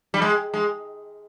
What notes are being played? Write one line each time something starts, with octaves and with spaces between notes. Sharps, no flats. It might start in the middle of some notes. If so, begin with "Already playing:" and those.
G3
G#3
G#3